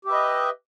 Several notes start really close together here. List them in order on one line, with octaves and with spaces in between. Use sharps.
G4 E5 B4 D#5